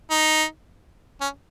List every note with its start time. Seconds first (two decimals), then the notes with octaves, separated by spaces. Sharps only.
0.10 D#4
1.21 C#4